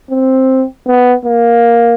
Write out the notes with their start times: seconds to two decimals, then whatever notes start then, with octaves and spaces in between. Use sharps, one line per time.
0.11 C4
0.88 B3
1.25 A#3